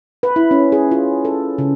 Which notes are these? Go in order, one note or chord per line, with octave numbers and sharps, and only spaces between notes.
B4
E4
C#4
G#4
F4
A4
C#3